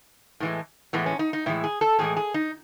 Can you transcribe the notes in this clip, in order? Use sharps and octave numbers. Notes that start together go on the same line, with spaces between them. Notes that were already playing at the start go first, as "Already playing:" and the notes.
A2 E3 G#3
A2 E3 G#3 B3
C#4
D#4
D#4
A2 E3 G#3 E4
G#4
A4
A2 E3 G#3 G#4
G#4
D#4